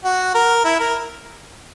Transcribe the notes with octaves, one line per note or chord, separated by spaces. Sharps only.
F#4
A#4
E4
A#4